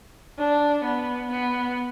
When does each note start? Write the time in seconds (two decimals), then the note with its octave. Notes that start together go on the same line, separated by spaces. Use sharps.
0.38 D4
0.84 B3
1.31 B3